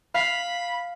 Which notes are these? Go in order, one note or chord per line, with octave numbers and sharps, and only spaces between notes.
F5 B5